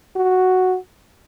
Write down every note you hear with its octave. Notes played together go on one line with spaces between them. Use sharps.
F#4